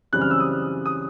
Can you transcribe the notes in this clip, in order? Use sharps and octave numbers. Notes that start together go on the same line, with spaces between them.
F#2 C#3 E3 G3 C4 F#6
F6
E6
D#6
D#6